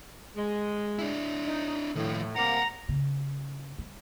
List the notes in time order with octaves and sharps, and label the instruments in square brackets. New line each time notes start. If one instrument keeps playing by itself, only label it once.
[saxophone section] G#3
[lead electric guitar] D4 E4
[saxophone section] D#4
[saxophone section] A2 [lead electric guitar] D#3 F3
[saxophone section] C3 G3 A#3 [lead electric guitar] F5 F#5 [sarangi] A#5
[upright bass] C#3
G3